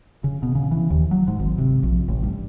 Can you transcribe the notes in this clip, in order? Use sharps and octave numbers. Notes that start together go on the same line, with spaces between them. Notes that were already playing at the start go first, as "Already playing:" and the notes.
C#3
B2
C#3
E3
D#2
F#3
G#2
G#1
C3
A#1
A1
G2